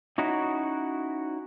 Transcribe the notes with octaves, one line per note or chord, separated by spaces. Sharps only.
C#4 D#4 E4 F#4